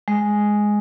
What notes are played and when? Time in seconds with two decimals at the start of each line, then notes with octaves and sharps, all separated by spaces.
0.08 G#3